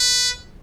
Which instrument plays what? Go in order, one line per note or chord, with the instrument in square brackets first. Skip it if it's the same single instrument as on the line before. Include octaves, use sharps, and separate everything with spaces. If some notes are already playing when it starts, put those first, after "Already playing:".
Already playing: [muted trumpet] B4